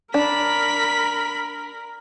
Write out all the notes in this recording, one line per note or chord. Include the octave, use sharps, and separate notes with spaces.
D4 A#4 B5 B6